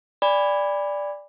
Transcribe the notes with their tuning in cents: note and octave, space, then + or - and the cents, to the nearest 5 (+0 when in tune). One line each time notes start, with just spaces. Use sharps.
D5 +0 G#5 -45 B5 +0